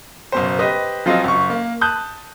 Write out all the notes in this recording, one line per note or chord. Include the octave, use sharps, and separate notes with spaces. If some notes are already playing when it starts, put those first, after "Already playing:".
F#1 B2 C5
G4 B4 C5 D#5
F3 F#3 C4 F4 D#5
F#1 C#6
A#3
A5 D#6 F#6 G6